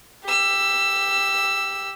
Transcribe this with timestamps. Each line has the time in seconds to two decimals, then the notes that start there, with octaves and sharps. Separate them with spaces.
0.24 G4 E6